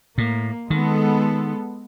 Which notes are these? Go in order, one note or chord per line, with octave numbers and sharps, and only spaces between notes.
A2 A#3
D#3 G#3 B3 A4